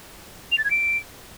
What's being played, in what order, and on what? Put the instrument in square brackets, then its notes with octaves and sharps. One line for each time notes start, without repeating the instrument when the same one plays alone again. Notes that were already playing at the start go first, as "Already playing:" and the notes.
[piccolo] F7
A6
G#6
D7